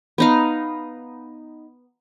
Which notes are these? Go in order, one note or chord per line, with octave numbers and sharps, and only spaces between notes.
B3 D#4 F5